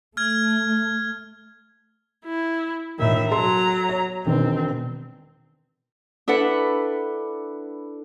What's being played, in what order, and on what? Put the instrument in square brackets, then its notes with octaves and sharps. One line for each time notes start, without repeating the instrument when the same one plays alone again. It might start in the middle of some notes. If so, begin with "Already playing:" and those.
[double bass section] A3 [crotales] F6 G#6
[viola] E4
[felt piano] E1 A2 [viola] D#3 E5
[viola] F#3 A#5 [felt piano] A4 C6
[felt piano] C#5
[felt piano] E1 D#3 B4 [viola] C4
[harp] D4 E4 A4 B4 F#5